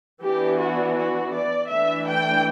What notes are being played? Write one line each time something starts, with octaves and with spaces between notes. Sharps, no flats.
E3 B3 D4 G4
F#4
F#4
D5
E3 A3 D4 E5
G5